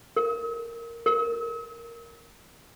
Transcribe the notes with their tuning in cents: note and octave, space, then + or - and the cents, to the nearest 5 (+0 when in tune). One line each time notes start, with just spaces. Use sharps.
A#4 -5
A#4 +0